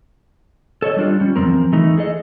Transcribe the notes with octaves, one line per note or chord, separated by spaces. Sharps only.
A4 C#5 D#5
G3 D4 F4
G3 C#4
E2 C3 F3 C4 A#4
E3 A3 D#4
G#4 A4 D#5